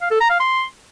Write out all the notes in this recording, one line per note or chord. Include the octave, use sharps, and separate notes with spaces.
F5
A4
A#5
F5
C6